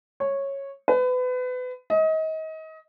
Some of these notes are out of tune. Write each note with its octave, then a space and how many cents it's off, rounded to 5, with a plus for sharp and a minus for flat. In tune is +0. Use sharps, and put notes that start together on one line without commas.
C#5 -10
B4 +30
D#5 +30